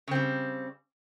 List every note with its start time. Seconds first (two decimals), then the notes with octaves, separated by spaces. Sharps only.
0.08 C#3
0.11 C4
0.15 G3